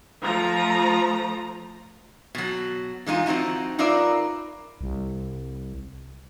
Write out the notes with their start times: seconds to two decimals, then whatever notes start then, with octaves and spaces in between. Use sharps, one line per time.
0.23 F3 A3 A#5
2.35 B2 F#3
3.06 E3 G#3 D#4 F4
3.26 F3 C4 D#4 E4 F#4
3.79 D#4 F4 A#4 B4 D5 E5
4.81 C2